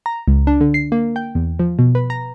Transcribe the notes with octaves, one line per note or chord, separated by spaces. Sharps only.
A#5
C#2
D4
D3
C7
A#3
G5
E2
F3
B2
B4
A#5